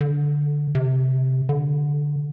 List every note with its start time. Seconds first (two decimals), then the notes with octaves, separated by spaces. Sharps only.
0.01 D3
0.75 C3
1.49 D3